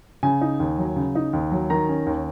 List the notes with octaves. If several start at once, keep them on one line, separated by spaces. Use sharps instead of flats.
C#3 G#5
D#4
D#2
F#3
C#3
D#4
D#2
F#3
D#3 A#5
C#4
D#2